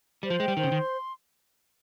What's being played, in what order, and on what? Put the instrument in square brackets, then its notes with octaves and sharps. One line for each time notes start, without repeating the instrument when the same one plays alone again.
[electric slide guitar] G3 [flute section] C5
[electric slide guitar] F3
[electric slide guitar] G#3 [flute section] G5
[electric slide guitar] G3
[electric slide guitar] D#3 [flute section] C5
[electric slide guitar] C#3
[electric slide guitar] D#3 [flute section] C6